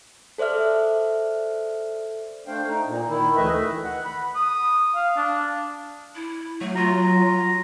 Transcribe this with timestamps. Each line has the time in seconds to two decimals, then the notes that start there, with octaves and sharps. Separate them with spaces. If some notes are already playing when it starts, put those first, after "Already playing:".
0.38 A4 C5 D5 E5 F6
2.47 A3 D4 C5 F5 G5
2.68 D#4
2.87 A#2
3.09 D#3 E4
3.36 D2 E3 A3 B4 D#5 E5
3.84 F#5
4.05 B5
4.36 D#6
4.95 F5
5.17 D4
6.15 E4
6.61 F#3 A3
6.76 F4 A#5